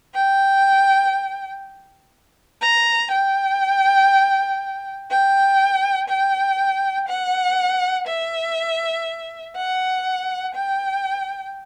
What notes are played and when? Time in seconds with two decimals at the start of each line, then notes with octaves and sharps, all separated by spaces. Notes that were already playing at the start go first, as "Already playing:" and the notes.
0.14 G5
2.61 A#5
3.12 G5
5.11 G5
6.09 G5
7.08 F#5
8.08 E5
9.56 F#5
10.55 G5